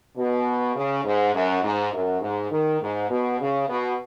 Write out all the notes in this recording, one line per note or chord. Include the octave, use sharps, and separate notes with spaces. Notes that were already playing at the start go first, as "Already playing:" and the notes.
B2
C#3
G#2
F#2
G#2
F#2
G#2
D#3
G#2
B2
C#3
B2